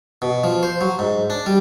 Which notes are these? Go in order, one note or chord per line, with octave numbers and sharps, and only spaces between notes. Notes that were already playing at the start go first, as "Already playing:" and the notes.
B2
F3
C5
F#3
G#2
D4
G3